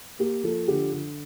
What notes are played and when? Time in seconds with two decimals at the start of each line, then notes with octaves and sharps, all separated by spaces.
0.19 A#3 G4
0.43 F3 A4
0.68 D3 G4
0.92 D3